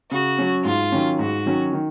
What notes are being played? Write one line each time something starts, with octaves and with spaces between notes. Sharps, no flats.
C#3 F#4
F#3 C#4
G#2 F4
D#3 F#3 C#4
G#2 F#4
D#3 F#3 C#4
D#3